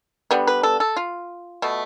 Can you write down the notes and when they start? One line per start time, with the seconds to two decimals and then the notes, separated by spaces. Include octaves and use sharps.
0.31 D3 G3 B3
0.47 B4
0.63 A4
0.80 A4
0.96 F4
1.62 B2 A3